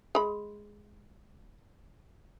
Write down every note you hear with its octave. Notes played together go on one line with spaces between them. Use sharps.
G#3 B5